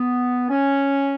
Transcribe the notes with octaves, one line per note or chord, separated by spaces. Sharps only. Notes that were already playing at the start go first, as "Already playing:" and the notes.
Already playing: B3
C#4